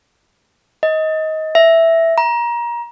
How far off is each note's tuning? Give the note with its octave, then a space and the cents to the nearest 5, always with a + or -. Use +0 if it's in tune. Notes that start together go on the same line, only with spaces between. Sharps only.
D#5 +20
E5 +0
A#5 +25